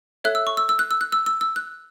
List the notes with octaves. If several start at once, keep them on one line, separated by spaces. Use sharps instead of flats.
A4 C#5 E5 F#6
E6
C#6
E6
E6
F#6
E6
F#6
E6
E6
E6
F#6